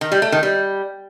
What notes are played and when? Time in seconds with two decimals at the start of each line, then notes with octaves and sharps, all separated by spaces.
0.01 D#3
0.12 G3
0.22 A3
0.32 D#3
0.43 G3